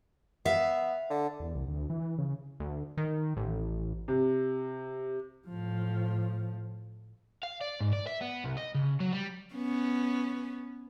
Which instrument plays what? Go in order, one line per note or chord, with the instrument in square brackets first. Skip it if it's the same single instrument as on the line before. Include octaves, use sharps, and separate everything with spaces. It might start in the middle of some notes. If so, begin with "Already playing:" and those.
[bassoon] B3 [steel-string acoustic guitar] E5 F5
[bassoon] D3
[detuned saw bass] E2
C2
D2
E3
C#3
[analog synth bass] D2
D#3
A1
[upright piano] C3
[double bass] A2 F3
[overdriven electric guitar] F5
D5
G#2
D5
E5
B3
C2
D#5
C#3
F#3
G3
[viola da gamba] B3 C#4